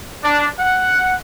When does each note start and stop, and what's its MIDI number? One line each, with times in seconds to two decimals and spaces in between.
0.23 0.47 62
0.59 1.15 78